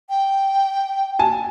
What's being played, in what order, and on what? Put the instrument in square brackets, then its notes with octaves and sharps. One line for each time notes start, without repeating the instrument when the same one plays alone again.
[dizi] G5
[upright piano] G#5 A5